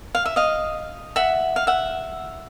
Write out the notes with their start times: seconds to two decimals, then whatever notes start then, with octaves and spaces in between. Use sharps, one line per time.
0.15 F5
0.26 E5
0.36 D#5 F5
1.16 E5 F#5
1.56 F5
1.67 E5 F#5